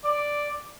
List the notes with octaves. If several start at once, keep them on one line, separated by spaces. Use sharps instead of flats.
D5